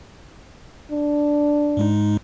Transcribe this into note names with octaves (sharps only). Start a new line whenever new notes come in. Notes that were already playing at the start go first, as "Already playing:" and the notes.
D4
G#2 G#3 D#4